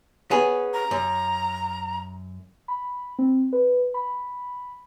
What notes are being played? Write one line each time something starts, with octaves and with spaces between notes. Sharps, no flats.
B3 C#4 G#4
A#5
F#2
B5
C4
B4
B5